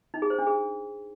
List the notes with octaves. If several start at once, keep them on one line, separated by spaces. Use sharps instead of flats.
D#4
G#4
C5
D4
G#4